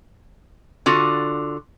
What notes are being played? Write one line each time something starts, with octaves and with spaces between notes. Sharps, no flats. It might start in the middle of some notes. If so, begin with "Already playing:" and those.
D3 F4 F#4